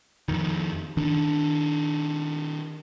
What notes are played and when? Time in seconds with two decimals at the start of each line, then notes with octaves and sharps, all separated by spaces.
0.28 F2 D#3
0.97 D#3 D4